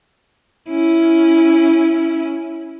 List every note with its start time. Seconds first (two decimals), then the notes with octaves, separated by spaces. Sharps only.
0.69 C#4 E4